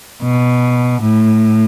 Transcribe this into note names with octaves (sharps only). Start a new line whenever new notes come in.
B2
A2